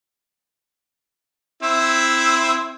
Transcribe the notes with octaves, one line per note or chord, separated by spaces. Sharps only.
C4 E4 E5